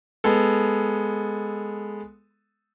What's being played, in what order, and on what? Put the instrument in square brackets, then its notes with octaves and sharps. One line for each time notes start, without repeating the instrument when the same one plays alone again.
[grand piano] G#3 B3 A4